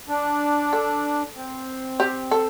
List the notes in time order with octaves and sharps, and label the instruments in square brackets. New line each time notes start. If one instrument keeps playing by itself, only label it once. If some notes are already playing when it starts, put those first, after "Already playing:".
[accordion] D4
[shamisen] A4
[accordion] C4
[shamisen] G4
A4